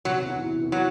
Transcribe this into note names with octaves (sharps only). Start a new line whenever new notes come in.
C3 F#3
E3 B3 F#4
C3
E3 B3 F#4
F#3